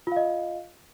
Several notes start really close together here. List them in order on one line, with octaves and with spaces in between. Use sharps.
F4 F5 D#5